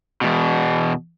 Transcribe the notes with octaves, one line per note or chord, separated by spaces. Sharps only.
E2 B2